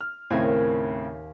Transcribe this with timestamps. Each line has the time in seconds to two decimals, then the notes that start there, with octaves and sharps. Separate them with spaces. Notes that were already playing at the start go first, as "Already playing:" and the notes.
0.01 F6
0.30 D#2 A2 C#3 C4 A#4 G#5